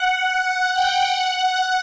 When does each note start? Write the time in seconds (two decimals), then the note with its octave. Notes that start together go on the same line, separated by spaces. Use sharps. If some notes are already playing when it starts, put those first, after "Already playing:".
Already playing: F#5
0.43 F#5
0.74 G5
1.04 F#5